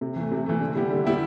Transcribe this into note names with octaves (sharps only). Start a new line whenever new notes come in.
C3
E3
A3
C3
E3 A3
D3
G3 B3 E4 G4
D3
G3 B3 E4 G4